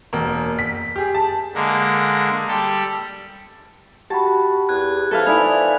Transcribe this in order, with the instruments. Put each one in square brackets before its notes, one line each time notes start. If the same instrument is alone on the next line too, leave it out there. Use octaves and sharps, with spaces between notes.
[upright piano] E1 A#3
B6
G4 G#4
A5
[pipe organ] D3 G#3 A#3
G3 G4 A4
[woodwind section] F#4 [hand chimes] G4 B5 [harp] A5
[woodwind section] E2 [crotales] F#6 G#6
[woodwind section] F2 E3 [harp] A4 B4 F5
[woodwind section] F3 B5 [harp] D#4 E4 [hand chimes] D5 G#5 G#6 [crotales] F7